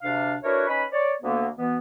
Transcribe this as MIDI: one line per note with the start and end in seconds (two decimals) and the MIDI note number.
0.02 0.34 38
0.02 0.34 48
0.02 0.34 62
0.02 0.34 77
0.43 0.65 62
0.43 0.65 64
0.43 0.65 66
0.43 0.65 70
0.43 0.65 71
0.43 0.65 73
0.67 0.83 61
0.67 0.83 63
0.67 0.83 71
0.67 0.83 80
0.67 0.83 83
0.92 1.12 73
0.92 1.12 74
1.22 1.47 38
1.22 1.47 50
1.22 1.47 58
1.22 1.47 59
1.58 1.77 47
1.58 1.77 52
1.58 1.77 59